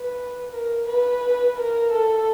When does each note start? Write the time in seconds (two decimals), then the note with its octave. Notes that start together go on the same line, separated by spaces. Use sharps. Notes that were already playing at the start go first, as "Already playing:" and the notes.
Already playing: B4
0.51 A#4
0.87 B4
1.57 A#4
1.92 A4